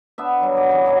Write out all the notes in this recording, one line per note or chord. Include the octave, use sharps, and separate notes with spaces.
B3 D4 E5
F#3 G3
D6
C#3 E3
F#3 D5 D#5 F#5